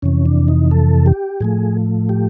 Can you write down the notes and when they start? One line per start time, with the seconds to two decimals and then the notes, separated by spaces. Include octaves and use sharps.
0.02 F2 C3 E3 C#4
0.26 D4
0.48 D#4
0.71 A4
1.06 G4
1.40 A2 F3 A3 G#4
2.09 G4